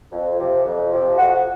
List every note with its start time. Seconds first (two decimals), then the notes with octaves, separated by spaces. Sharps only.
0.12 F2
0.39 C3 F3
0.65 F2
0.92 C3 F3
1.18 F2 F#4